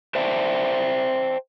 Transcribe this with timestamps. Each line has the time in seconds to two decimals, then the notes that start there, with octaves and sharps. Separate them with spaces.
0.15 C5 D5 E5 G5 A5